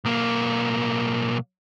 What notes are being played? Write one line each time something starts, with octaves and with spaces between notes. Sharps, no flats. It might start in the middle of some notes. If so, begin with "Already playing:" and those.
B1 A#3